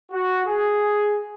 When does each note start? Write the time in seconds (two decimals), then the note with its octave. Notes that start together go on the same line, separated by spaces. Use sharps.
0.12 F#4
0.46 G#4